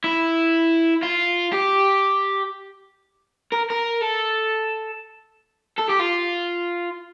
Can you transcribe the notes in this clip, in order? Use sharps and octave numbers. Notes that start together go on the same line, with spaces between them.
E4
F4
G4
A#4
A#4
A4
A4
G4
F4